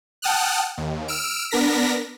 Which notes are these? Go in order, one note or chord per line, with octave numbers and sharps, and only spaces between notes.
F#5 G5 A5 D#6 F6 F#6
D#2
E6 F6 D7
B3 D4 A#4 A#6 B6